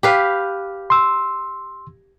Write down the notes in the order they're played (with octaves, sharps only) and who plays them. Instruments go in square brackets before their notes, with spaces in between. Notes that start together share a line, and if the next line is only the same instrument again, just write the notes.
[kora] G4 B4 F5
[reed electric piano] C6 E6